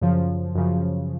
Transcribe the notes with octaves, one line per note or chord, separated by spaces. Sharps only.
F#2 C#3 F3
F#2 C#3 F3